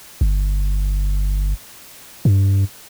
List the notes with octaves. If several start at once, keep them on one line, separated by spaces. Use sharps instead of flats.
G1
G2